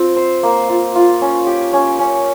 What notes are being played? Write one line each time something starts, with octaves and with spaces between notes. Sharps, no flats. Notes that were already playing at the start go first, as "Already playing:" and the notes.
Already playing: C4 F4
C5
A#3
F4
F4
C#4
G4
C#4
C#4